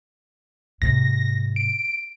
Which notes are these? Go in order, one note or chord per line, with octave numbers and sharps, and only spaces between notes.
G#2 C3 A#6
D7